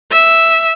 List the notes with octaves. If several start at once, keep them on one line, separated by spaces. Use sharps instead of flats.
E5